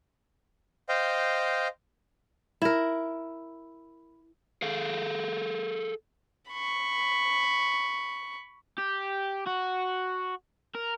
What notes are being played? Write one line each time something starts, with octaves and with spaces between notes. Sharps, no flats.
C5 D#5 F5 G5
E4 A#4
G#4 A4 F5
B5 C#6
G4
F#4
A#4